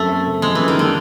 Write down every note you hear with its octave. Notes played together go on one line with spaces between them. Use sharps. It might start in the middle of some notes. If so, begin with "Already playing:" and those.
Already playing: F#2 A3 C4
A#3
C#3
F3 G#3
F#2 E3
D#3
D3 A#3